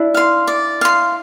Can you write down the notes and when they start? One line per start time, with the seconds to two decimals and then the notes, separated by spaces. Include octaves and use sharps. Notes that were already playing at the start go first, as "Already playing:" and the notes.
Already playing: D4 E4
0.14 F5 C6
0.47 D5
0.81 F5 C6